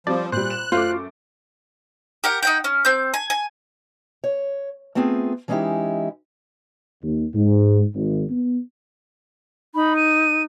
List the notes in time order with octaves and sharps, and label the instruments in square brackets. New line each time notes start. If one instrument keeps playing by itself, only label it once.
[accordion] F3 [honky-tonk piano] G3 C4 [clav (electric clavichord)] D5 A5
[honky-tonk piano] A#2 G3 [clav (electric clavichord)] C5 [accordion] F#6
[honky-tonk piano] E7
[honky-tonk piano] F#2 A3 D6 [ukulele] F4 [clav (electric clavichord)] C5
[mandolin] G4 A#4 F#5
D#4 F#5 G5
C#4
C4 G6
G#5
G#5
[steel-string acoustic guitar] C#5
A3 B3 C4 F4 G#4
E3 G#3 C#4 D#4 E4 G4
[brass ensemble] D#2
G#2
G#1
B3
[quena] D#4 [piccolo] B5
[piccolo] D#7